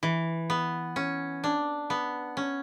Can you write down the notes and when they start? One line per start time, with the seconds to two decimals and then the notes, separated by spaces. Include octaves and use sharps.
0.03 E3
0.50 B3
0.96 C#4
1.44 D4
1.90 B3
2.37 C#4